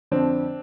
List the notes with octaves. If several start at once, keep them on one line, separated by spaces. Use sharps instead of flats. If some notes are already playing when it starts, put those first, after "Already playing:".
F2 D3 F3 C4 D4